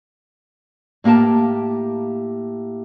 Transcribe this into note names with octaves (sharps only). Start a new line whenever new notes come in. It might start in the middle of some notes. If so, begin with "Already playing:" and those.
A2 A#3 G4 A#4 A5